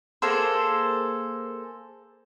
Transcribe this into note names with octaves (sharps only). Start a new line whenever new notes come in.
A#3 G#4 A4 C5